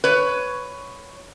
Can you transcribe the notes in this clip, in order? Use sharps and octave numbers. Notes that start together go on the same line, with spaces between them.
B4 C#5